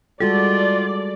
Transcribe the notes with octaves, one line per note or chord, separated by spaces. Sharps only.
G3 G#3 F4 F#4 A4 D5